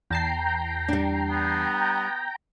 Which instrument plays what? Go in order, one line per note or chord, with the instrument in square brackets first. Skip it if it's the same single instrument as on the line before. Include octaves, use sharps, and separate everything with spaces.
[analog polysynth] E2 A5 C7 [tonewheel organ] G5 A#5
[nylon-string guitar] G3 D4
[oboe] B3